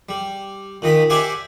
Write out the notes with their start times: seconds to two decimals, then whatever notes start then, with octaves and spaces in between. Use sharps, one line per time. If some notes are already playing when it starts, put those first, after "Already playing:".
0.09 G3
0.82 A#2 D#3 D#5 B5
1.10 G4 C5 D5 E5 F#5 G#5